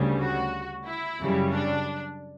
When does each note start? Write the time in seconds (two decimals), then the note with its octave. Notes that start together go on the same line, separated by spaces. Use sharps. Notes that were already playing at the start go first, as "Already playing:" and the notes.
Already playing: D2 C#3 G3
0.21 F#4
0.86 E4
1.19 F#2 C#3 G3
1.52 D4